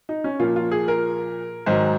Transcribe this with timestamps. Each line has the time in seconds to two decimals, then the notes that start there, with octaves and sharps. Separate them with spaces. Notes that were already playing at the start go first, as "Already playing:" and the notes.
0.09 D#4
0.24 C#4
0.40 A#2 F3 A#3 F4
0.56 F4
0.71 G#4
0.88 A#4
1.66 G#2 D#3 F#3 C5